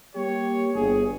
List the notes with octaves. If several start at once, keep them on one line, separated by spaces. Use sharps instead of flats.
G3 A#3 G4 C#5
G1 G#4